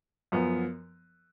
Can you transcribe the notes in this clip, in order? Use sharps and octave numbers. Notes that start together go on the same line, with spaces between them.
F#2 F3 B3